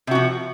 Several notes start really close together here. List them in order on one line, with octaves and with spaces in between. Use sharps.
C3 F#4 F3